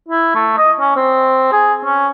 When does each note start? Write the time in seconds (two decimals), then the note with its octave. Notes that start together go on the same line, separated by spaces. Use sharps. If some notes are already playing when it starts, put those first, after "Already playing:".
0.08 E4
0.35 A3
0.58 D#5
0.81 C#4
0.96 C4
1.52 G#4
1.85 C#4